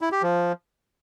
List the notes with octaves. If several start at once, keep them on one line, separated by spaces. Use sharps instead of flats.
E4
G4
F3